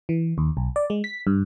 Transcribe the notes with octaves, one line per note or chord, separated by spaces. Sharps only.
E3
D#2
B1
D5
G#3
B6
G2